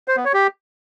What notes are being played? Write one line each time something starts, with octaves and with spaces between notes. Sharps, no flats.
C5
B3
C#5
G4